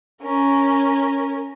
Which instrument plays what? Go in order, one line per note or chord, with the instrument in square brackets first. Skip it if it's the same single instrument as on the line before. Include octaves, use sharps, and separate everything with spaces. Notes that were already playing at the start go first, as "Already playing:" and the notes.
[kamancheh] C#4 A#4